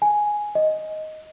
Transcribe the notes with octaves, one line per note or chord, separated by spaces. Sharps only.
G#5
D#5